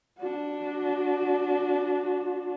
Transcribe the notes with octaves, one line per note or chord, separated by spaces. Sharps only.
D4 F#4